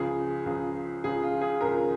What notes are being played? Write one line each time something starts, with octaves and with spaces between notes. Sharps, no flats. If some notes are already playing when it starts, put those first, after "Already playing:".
Already playing: C#2 C#3 F3 G#4
C#2 C#3 F3
C#2 C#3 F3 G#4
F4
G#4
C#2 C#3 F3 A#4